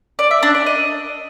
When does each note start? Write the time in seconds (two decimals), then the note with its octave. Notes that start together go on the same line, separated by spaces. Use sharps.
0.19 D5
0.31 E5
0.43 D4
0.54 D5
0.66 D#5